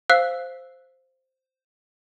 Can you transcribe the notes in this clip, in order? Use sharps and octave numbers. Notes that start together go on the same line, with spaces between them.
C5 F5 E6 F#6 C7